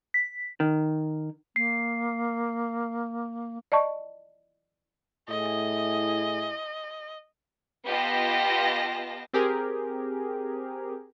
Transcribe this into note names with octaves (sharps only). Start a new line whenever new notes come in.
B6
D#3
A#3 C7
D5 D#5 A5 C#6
A2 E4 G#4 D#5
B3 F4 G4 D#5 A5 A#6
C4 G4 G#4 A#4